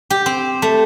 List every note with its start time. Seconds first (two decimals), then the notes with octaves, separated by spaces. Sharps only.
0.10 G4
0.26 C4
0.62 A3